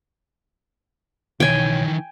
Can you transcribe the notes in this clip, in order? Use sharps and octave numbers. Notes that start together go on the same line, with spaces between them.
B1 D#3 E3 C#5 G5 G#5